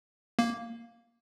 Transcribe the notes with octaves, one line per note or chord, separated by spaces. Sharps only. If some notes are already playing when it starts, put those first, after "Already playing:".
A#3